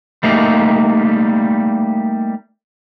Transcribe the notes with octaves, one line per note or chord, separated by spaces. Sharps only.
G3 A3 A#3 D#4